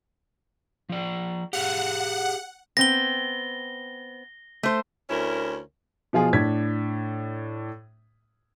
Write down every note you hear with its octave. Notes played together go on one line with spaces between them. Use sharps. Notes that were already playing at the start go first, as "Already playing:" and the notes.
F3 D5
G4 G#4 F5 F#5
B3 C4 A#6 G7
A3 C5
D2 C#4 E4 A#4
B2 F3 F4 G#4
A2 D4 G#6 B6